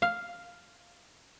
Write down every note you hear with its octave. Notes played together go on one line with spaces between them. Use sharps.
F5